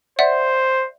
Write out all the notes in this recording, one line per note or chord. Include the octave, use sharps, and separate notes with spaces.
C5 D5 E5 F#5